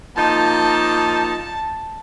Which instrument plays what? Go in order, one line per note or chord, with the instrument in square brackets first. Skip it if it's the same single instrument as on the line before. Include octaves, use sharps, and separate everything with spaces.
[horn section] F3 A#3 D#4 [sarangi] A5